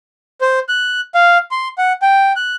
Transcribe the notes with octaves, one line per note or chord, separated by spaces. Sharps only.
C5
F#6
F5
C6
F#5
G5
F#6